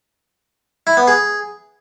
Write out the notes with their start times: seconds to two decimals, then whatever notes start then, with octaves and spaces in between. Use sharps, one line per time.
0.87 E4
0.97 B3
1.07 G#4